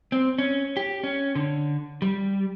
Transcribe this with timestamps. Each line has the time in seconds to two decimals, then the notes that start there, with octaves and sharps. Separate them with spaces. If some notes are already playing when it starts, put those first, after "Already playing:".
0.12 C4
0.39 C#4
0.77 G4
1.04 C#4
1.35 D3
2.02 G3